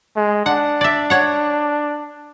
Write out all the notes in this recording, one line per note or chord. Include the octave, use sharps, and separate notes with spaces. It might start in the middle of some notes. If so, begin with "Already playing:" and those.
G#3
D4 F#5
D5 E5
C#5 F#5